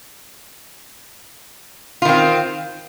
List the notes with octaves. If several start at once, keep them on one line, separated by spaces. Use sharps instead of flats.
D#3 C4 F4